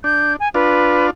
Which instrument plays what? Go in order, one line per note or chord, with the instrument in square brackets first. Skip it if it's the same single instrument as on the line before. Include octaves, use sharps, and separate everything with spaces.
[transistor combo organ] D4 [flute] G6
[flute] G#5
[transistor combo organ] D4 F4 [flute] B4